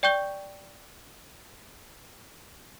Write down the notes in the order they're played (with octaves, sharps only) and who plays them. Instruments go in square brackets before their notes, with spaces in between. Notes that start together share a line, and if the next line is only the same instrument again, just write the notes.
[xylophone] D5 G5 C#6 G6 G7